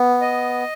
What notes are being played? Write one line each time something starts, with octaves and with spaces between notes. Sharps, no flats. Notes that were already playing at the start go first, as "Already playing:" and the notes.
Already playing: B3
D#5